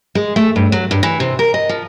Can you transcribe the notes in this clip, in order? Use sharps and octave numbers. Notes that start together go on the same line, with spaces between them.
G#3
A3
G2
F#3
G2
E3
C3
A#4
D#5
F3